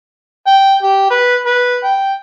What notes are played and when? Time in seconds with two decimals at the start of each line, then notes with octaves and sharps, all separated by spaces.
0.47 G5
0.83 G4
1.10 B4
1.46 B4
1.84 G5